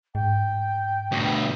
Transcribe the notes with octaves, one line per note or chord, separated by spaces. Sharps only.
G#2 G5
D2 B2